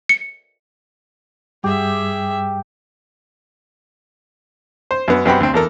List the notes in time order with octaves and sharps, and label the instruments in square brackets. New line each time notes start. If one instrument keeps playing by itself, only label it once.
[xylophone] C#7
[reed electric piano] G2 G3 [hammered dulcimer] G4 [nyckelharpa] G#4 E5
[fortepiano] C5
F#2 B3
F#2 B3 C4 G4 F#5 B5
D2 C4
E2 A4 A#4